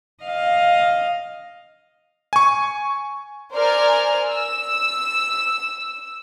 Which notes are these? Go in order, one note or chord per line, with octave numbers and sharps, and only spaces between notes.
D#5 F5
G#5 C#6
A#4 C5 D5 G#5 F6
E6